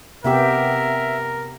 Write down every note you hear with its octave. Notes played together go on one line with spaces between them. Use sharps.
C3 B3 G4 A#4 E5